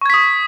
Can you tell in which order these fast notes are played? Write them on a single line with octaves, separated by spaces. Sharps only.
C#6 G#6 B6 D#6